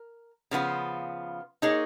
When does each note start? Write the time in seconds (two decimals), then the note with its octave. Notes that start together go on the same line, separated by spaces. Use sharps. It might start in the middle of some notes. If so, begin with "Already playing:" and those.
Already playing: A#4
0.51 C#3 F3 B3 F4
1.62 A#3 D#4 G#4 C#5